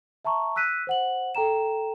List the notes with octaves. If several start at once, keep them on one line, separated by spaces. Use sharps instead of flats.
E5 A5 A#5 C#6
E6 F#6 B6 D#7
C5 F#5 F#7
A4 G5 A#5 E7